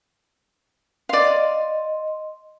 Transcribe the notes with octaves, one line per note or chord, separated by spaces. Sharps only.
D5 D#5 F5 C6